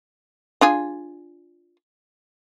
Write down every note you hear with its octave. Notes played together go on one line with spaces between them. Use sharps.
D4 F4 G#4